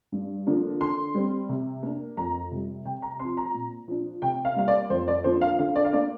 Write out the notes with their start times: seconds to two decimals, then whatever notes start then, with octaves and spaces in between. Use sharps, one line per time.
0.12 G2
0.46 D3 F3 A#3 D4
0.80 D3 C6
1.15 G3 C4
1.49 C3
1.83 A#3 D4
2.17 F2 A#5
2.51 C3 G3
2.85 C3 G5
3.02 A#5
3.19 F3 C4 C6
3.37 A#5
3.54 A#2
3.88 F3 D4
4.22 C3 G5
4.45 F5
4.56 G3 A#3 F5
4.68 D5
4.90 F2 C5
5.08 D5
5.24 D3 F3 A#3 D4 C5
5.41 F5
5.59 D3 F5
5.76 D5
5.85 F5
5.93 A#3 D4 D5